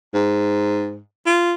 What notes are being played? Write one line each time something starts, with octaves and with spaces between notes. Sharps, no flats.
G#2
F4